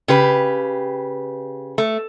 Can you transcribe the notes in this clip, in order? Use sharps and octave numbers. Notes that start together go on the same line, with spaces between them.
C#3 G4 B4
A3